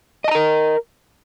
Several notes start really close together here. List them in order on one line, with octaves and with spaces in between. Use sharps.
D#5 A5 A#5 A#4